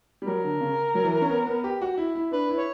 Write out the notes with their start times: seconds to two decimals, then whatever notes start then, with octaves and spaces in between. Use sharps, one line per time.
0.22 G3
0.27 F#3 A#4
0.44 D3
0.61 C#3
0.95 F#3
1.04 E3
1.21 C#4
1.29 B3
1.46 B3
1.64 G4
1.81 F#4
1.98 E4
2.15 E4
2.32 D4 B4
2.50 E4
2.58 C#5